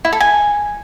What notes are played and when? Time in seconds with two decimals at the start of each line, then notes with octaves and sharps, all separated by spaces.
0.05 E4
0.13 A4
0.20 G#5